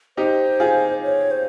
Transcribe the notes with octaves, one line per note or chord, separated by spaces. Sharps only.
D#4 G4 C5
F4 G#4
C#5
C5